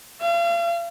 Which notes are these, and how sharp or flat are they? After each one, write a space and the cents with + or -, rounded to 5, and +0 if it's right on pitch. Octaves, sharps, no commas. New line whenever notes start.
F5 -40